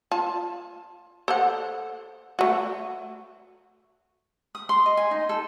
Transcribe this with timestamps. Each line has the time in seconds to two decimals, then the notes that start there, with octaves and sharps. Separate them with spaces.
0.12 F4 A5
1.28 A4 C5 F#5
2.39 A3 F#4
4.55 D#6
4.69 C6
4.86 D#5
4.97 G#5
5.11 D#4
5.29 A4